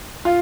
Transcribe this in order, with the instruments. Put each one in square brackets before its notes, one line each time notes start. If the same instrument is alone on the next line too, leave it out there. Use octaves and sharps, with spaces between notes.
[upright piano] F4